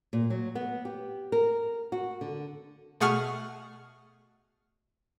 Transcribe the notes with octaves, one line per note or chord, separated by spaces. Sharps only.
A#2
F#3
B3
G4
A#4
F#4
D3
B2 A3 G#4 F#5 C#6 F6